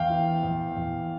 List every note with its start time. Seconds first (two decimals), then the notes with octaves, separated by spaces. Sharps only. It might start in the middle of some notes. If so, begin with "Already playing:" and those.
Already playing: E2 F5 G5
0.10 E3
0.43 E2
0.77 E2